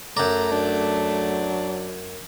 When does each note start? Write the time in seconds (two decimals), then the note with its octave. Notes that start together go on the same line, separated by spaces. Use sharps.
0.17 F#2 A3 D5 A#5
0.52 F#3 D4